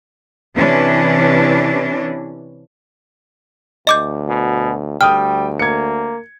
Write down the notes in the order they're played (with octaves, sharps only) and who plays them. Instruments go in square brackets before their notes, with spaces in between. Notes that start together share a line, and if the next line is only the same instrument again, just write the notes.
[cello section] C3 E3 C#4 D4
[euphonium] D2 [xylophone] D#5 D6 G6
[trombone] B2
[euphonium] D2 [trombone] G3 [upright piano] G5 D#6 [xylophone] F6
[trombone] A#3 [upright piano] G#6 C#7